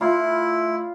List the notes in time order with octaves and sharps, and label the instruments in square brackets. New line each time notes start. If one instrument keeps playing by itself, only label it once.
[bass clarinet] A3 [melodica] E4 [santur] F4 D5 B5